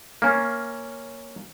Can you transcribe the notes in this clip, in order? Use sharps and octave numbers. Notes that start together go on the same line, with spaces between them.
A#3 C#4